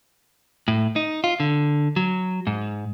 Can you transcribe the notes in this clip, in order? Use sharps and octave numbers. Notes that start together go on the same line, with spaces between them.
A2
D#4
F4
D3
F#3
G#2